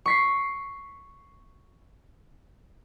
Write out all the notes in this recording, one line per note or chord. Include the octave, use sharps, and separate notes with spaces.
C#6 B6 C7